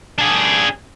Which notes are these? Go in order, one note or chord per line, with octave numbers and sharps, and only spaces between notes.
D4 G#4